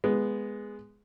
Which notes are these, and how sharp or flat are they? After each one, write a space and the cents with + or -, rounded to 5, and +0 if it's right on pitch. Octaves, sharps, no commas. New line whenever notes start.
G#3 +0 B3 +0